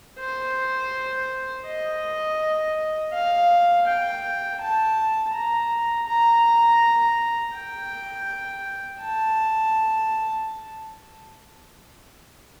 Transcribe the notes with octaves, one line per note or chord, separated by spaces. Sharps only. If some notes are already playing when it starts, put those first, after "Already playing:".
C5
D#5
F5
G5
A5
A#5
A#5
G5
A5